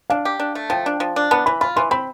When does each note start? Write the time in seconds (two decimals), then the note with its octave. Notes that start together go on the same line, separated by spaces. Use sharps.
0.10 D4 F5
0.25 G4
0.40 D4
0.55 A3
0.70 F3 G5
0.86 D4
1.00 F3
1.16 D4
1.31 B3 A5
1.46 E3 B5
1.61 F4 B5
1.76 E3 C6
1.91 C4 B5